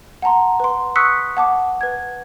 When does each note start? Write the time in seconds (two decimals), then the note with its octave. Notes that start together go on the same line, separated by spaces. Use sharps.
0.22 F#5 A5 A#5 C6
0.60 B4 C6
0.96 C#6 D#6 E6 F#6 B6 C#7
1.37 F#5 A5 D6
1.81 B4 G#6